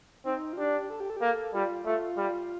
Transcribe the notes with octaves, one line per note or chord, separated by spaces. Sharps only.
C4 D#4
F4
D4 G4
A4
G4
A4
G4
A#3 A4
G3 F4
A3 F4
G3